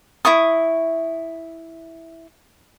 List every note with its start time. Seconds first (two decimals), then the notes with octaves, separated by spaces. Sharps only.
0.25 E4 E5 C#6 D#6